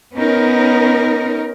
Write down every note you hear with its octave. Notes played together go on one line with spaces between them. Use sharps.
B3 C#4 D#4 A#4